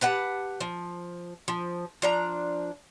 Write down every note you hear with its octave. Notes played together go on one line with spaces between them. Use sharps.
G4 B4 F#5 A5
F3
F3
F3 D4 A#5